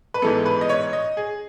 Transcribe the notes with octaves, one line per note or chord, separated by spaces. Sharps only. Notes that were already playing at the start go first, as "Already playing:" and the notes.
B4
G#2 E3 G#3 B3 A4
B4
D#5
C#5
D#5
G#4